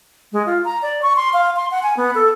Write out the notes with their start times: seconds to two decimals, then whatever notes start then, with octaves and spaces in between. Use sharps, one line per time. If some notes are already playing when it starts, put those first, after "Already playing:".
0.32 G#3
0.46 F4
0.65 A#5
0.82 D5
1.02 C#6
1.16 C6
1.33 F5
1.56 C6
1.71 F#5
1.83 G#5
1.97 B3
2.15 A4